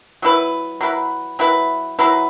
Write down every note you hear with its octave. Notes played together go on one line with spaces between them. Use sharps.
F#3 E4 B4
F#3 E4 B4
F#3 E4 B4
F#3 E4 B4